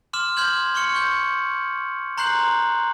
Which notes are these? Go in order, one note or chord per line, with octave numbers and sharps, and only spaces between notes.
C6 D6 F6 E7
C6 F6 G6 G#6 F#7
C6 C#6 F6 C#7
C#6 G6
A#5 C6 F#6 G6 C7 F#7